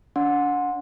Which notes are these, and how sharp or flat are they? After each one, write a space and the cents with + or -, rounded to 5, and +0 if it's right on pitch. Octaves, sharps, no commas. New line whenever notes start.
D4 -30 F#5 -30 C6 +0